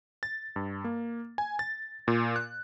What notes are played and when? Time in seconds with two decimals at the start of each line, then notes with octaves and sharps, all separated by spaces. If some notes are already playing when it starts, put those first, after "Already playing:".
0.23 A6
0.56 G2
0.84 A#3
1.38 G#5
1.59 A6
2.08 A#2
2.36 F#6